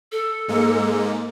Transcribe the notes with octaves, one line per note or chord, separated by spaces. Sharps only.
A4
G#2 G#3 A#3